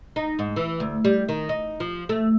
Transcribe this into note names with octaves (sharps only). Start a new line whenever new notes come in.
D#4
G#2
E3
D2
G3
D#3
D#4
F3
A3